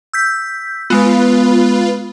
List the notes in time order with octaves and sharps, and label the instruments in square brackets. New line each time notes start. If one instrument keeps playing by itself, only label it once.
[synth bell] E6 G6 B6
[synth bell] G#3 B3 [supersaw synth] F4 B4